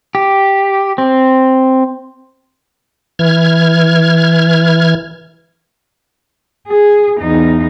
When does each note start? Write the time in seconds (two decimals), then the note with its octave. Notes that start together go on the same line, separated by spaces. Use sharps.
0.15 G4
0.98 C4
3.19 E3 F6 G#6
6.68 G#4
7.20 E2 D#4